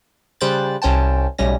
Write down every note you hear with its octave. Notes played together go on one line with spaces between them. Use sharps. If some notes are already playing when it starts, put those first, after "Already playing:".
C#3 G3 C5 G5 F#6 A6
C2 C#4 C5 G5 A5
B1 A2 G3 C#4 A#6